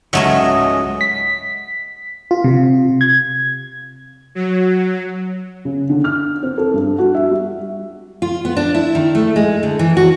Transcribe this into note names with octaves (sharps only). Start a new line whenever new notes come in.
C#2 G#2 C#3 F#3 A3 C#4 D#5
B6
F4
C3
G#6
F#3
C#3
D3
F6
C4
A4
G2
F#4
E5
G3
F4
B3
D4
E4
D#3
A3
G#3
D3
E3
F#4